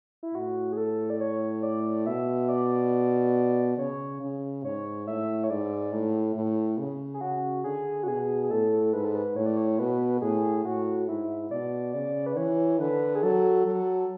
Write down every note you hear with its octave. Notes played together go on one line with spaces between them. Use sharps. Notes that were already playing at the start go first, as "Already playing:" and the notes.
E4
A2 F#4
G#4
A4
D5
C#5
D5
B2 E5
D5
C#3 C#5
C#3
G#2 C#5
A2 E5
C#5
G#2 D5
A2
A2
C#3
G#4
C#3 F#4
D3 G#4
F#4
B2 G#4
G#4
A2 A4
G#2 B4
A4
B4
A2 C#5
D5
C#5
B2 B4
F#4
A2 G#4
A2 F#4
G#2 E4
B2 D5
C#3 D5
B4
E3 C#5
D3 B4
G#4
F#3 A4
F#3 A4